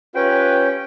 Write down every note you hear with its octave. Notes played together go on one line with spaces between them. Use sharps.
C#4 F4 G4 B4 G5